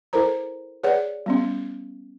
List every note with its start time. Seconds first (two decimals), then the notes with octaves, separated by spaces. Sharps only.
0.13 E4 A4 A#4 C5 A#5
0.83 G#4 B4 C#5 D5 F#5
1.26 G3 B3 C#4